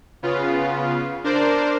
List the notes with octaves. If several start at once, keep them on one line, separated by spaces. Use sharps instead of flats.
C#3 B3 F4
D4 A#4 C5 D5